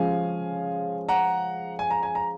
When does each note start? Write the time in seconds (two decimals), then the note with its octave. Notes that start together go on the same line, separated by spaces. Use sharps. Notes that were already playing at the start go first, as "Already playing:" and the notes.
Already playing: F3 G#3 C#4 F5 G#5
1.09 F#5 A#5
1.79 G#5
1.91 A#5
2.03 G#5
2.15 A#5